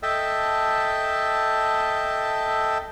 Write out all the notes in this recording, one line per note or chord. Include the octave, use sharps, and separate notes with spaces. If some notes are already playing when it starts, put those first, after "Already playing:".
A4 D#5 E5 G5 A5